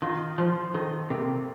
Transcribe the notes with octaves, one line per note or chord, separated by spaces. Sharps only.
D#3 F4
F3 C5
D#3 A4
C3 A#3